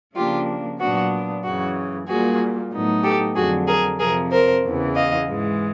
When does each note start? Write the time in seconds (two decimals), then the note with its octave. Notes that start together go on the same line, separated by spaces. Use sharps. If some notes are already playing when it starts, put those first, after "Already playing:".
0.16 C#3 F3 A#3 D4 F4 G4
0.80 A#2 F#3 B3 D4 F#4
1.44 F#2 C#3 E3 F#4
2.08 A#2 G3 A#3 F#4 G#4
2.72 A2 F#3 B3 D#4
3.03 G4 A4
3.36 F2 D3 F#3 F#4 G#4
3.67 G#4 A#4
3.99 F2 C3 F3 G#4 A#4
4.31 A#4 C5
4.64 E2 C#3 E3
4.95 D#5 F5
5.28 G#2 E3 G#3